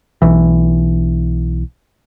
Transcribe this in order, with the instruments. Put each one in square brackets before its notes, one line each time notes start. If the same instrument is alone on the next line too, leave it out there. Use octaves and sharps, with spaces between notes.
[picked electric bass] B1 E3